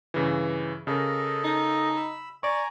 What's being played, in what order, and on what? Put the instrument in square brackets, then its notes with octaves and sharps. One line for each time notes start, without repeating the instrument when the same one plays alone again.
[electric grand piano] G2 C#3 E3
[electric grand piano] C#3 A#4 [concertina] A4 D#5
[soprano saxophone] D#4
[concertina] B5 E6
[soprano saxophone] D5 [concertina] G#5 A#5 [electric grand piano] C#6